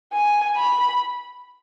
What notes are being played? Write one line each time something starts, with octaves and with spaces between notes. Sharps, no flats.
G#5
B5